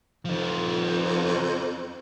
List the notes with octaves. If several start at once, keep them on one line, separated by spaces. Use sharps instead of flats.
F2 F3 D#4